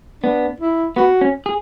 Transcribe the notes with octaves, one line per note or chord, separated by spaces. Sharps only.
B3 D4
E4
B3 F#4
C#4
G#4